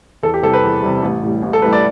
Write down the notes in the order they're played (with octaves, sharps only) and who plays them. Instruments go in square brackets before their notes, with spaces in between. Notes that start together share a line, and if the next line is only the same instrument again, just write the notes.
[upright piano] E2 A4
G4
C3 E3 G3 A4
B4
E2
C3 E3 G3
A1
A2 G3
A1
A4
A2 G3 B4
D5